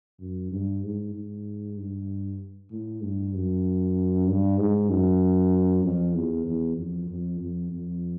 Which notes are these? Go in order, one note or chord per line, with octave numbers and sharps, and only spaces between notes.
F#2
G2
G#2
G#2
G2
A2
G2
F#2
G2
G#2
F#2
F2
E2
E2
F2
F2
F2
F2